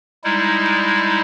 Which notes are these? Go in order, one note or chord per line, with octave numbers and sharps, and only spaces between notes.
G3 G#3 D#4 E4